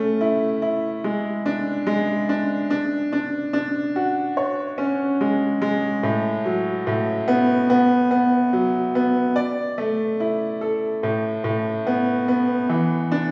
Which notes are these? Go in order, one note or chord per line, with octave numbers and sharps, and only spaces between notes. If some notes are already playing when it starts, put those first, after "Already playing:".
Already playing: A3 C#4
E4
E4
G#3
D4
G#3
D4
D4
D4
D4
F#4
C#5
C#4
G#3
G#3
A2
F#3
A2
B3
B3
B3
F#3
B3
D5
A3
E4
A4
A2
A2
B3
B3
E3
D4